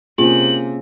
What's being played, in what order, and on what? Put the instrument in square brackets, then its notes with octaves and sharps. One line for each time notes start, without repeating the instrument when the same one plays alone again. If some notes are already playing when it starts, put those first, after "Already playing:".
[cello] C3 [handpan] A#3 C#4 G#4 [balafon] F4 [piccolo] F#7